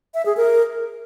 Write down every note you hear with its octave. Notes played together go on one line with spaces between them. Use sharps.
E5
G#4
A#4